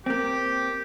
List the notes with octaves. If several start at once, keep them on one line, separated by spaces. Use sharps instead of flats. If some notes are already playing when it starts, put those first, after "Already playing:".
A#3 C4 G4